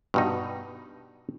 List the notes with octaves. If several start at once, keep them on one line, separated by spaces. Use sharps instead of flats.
G2 B2 D#4